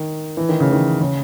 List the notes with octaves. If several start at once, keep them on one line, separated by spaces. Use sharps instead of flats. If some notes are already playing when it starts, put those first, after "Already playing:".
Already playing: D#3
E3
D#3
C#3
D#3
C#3